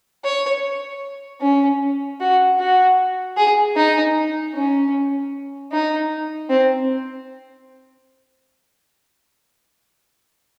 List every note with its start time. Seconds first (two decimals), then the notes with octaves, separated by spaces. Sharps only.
0.24 C#5
1.41 C#4
2.20 F#4
2.59 F#4
3.37 G#4
3.76 D#4
4.55 C#4
5.72 D#4
6.49 C4